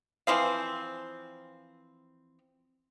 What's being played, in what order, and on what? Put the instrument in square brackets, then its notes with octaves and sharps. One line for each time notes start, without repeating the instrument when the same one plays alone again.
[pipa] E3 F3 C4 F5